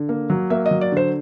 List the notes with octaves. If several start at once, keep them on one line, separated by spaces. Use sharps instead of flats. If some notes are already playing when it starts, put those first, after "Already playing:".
Already playing: D3
A#3
F#3
A#3 E5
D#5
F#3
D5
D3 C5